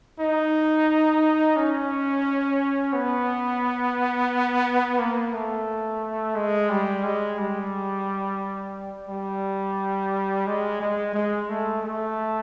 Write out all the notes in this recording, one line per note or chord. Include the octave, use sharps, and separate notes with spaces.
D#4
C#4
B3
A#3
A3
G#3
G3
G#3
G3
G3
G#3
G#3
G#3
A3
A3